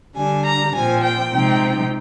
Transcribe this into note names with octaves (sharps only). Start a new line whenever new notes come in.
D3 G3 D4 G#5
A#5
A#2 F3 C4 G#5
G5
C3 F3 G#3 C4 D#4